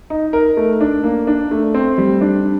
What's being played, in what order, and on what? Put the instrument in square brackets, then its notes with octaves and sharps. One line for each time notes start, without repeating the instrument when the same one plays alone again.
[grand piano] D#4
A#4
A3
D4
A#3
D4
A3
C4
G3
D4